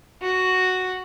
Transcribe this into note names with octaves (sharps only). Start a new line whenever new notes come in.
F#4